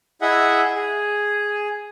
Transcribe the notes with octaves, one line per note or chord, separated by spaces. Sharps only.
E4 G#4 D#5 E5 F#5
G#4